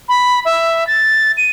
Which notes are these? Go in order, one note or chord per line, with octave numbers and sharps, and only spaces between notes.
B5
E5
A6
D#7